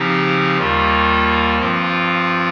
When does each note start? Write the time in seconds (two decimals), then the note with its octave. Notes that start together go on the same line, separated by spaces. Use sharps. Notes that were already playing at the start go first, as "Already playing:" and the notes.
Already playing: C#3 F3 C4 D#4 G4
0.58 D#2 D#3 G3 A#3 F4
1.58 G2 F3 C4 F4